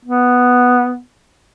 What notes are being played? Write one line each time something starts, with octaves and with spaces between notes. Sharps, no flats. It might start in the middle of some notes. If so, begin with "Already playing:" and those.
B3